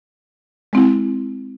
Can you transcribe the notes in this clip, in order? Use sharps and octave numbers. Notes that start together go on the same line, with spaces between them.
G#3 C4 E4